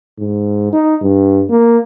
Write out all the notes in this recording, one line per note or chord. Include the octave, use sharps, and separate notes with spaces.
G#2
D#4
G2
A#3